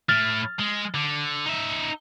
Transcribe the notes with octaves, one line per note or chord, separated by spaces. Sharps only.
A2 E4 F6 A6
G#3
D3
D#4 E5